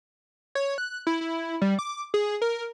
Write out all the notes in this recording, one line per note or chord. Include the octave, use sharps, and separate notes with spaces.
C#5
F#6
E4
E4
G3
D6
G#4
A#4